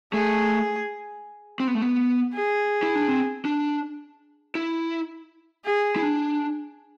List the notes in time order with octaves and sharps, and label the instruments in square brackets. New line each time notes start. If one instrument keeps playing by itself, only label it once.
[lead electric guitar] A3 [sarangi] G#4
[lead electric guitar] C4
B3
A3
B3
[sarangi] G#4
[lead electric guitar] E4
D4
C4
D4
E4
[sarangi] G#4
[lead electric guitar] E4
D4